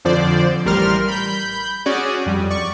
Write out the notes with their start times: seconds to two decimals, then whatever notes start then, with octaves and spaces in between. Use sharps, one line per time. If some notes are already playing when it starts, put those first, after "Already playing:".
0.05 F2 D3 F3 C5 D5
0.66 A1 G3 A#4 C6 F6
1.08 B5 G6
1.86 C#4 F#4 G#4 D5
2.26 F2 G3
2.50 D5 C#6